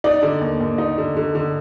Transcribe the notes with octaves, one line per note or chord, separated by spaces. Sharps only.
D#4 D5
D3
D#2
D#2
D#4
D3
D3
D3